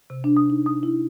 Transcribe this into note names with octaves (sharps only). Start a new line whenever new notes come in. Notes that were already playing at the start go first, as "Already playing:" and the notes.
C3
D4
D#6
D#4
D#6
E4